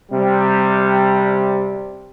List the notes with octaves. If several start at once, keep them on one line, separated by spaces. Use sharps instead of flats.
C3 G3